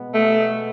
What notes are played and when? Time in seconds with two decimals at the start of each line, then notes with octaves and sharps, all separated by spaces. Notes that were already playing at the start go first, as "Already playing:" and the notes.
Already playing: B2 G#3 B3
0.14 A3